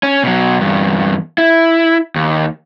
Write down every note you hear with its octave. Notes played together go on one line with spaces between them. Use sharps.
C#4
B2 F#3
E2 G2
E4
D#2